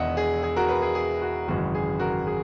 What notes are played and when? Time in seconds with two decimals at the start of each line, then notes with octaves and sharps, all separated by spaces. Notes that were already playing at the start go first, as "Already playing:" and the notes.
Already playing: E1 E2 D#3 D#5 E5 F#5
0.17 G#4
0.43 G#4
0.56 F#4 A#4
0.69 G#4 B4
0.82 G#4
0.95 G#4
1.22 F#4
1.47 G#1 F#2 C#3 E3 G#3 F#4
1.75 G#4
1.99 F#4 A#4
2.27 G#4